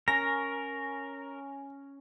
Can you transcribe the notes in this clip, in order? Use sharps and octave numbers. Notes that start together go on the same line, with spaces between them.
C#4 A#4 G#5 A#6